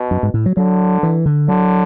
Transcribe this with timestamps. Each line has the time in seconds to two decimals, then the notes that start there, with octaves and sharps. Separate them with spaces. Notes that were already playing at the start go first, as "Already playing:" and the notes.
Already playing: B2
0.11 F#2
0.23 G#2
0.34 A2
0.46 F#3
0.57 D3 F#3
1.03 E3
1.26 D3
1.48 D3 F#3